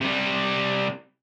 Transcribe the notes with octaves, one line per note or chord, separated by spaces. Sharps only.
C3 G3